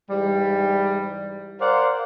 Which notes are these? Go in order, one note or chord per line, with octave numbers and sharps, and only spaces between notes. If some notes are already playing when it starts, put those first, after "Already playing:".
G#2 E3 G3
A#4 C5 D5 F5 F#5